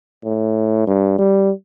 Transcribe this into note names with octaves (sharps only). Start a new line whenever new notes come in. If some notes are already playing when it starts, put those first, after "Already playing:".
A2
G2
G3